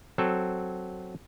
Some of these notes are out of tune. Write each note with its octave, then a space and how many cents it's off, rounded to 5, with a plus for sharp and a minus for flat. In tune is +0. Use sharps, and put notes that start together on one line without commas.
F#3 +0 C4 +0 A4 +0